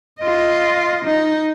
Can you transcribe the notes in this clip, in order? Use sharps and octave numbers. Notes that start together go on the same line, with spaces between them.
F4 D#5
D#4